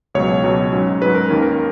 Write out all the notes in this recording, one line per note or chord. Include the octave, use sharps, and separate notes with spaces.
C#2 B2 F#3 C#5
C#2 B2 F#3
G#2 F#3 C#4
G#2 F#3 C#4 B4
A#4
D#2 D#3 A#3 C#4
A#4